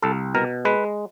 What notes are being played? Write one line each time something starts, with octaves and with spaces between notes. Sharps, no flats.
C2 A4
B2 A#4
G#3 B4